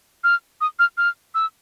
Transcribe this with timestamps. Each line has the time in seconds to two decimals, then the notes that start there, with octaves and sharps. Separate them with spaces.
0.24 F6
0.61 D#6
0.79 F6
0.98 F6
1.35 E6